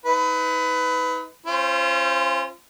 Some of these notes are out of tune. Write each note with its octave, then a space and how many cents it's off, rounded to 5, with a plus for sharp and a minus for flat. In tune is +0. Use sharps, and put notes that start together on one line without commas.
D#4 +40 B4 +20
C#4 -30 F4 -30 C5 +0